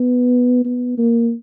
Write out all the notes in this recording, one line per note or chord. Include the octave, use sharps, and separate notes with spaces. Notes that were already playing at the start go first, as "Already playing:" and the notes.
Already playing: B3
B3
A#3